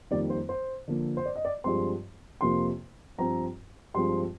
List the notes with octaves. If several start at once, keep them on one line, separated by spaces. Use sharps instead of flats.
F2 D#3 G3 A#3 D5
C5
C5
D3 F3 A#3
C5
D5
D#5
D5
G2 F3 G#3 C4 C6
F2 C3 F3 A#3 C6
G2 F3 C4 A#5
G2 F3 G#3 C4 C6